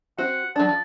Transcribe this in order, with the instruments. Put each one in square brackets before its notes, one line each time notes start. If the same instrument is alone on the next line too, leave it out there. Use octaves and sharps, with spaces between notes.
[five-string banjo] C4 F#4 [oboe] F#5
[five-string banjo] F#3 D4 [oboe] A5
[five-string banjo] F3